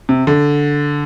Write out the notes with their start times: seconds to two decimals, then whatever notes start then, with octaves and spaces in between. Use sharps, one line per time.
0.09 C3
0.27 D3